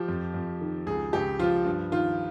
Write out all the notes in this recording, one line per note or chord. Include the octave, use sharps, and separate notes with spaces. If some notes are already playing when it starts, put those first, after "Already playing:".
Already playing: F3 G4
F2
F2
D#3
C#2 G#4
C#2 G4
F3 F4
G2
D#3 F4